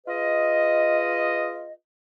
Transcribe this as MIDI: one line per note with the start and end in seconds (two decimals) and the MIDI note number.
0.07 1.72 65
0.07 1.72 68
0.07 1.72 71
0.07 1.72 75